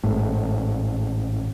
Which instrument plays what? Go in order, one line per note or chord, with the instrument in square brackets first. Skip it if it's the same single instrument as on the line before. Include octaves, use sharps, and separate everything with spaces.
[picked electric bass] A1 G#2 A3